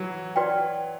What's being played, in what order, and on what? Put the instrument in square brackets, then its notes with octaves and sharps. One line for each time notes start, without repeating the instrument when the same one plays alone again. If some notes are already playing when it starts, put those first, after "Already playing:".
Already playing: [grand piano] E3 F#3
[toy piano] F#4 B4 D5 G5